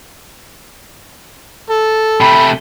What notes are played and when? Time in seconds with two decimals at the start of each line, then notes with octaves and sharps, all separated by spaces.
1.70 A4
2.21 C3 A3 B5